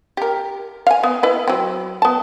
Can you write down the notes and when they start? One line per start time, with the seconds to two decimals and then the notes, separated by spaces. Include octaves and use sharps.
0.17 G4 A#4
0.87 F5 G#5
1.04 B3
1.23 E4 B4 D#5
1.48 F#3 C4
2.02 B3 A5